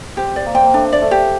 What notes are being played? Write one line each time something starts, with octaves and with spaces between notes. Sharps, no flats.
C4 G4
D5
A#3
C4 G5
A#3
A3 D4
D5
A3
G4